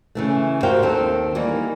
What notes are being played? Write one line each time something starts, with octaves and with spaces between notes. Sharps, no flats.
C#3 E3 A3
F#4 G4 A#4 C5 F5 G5
D#2 D#3 C4 A4
E3 G3 A#3 D#4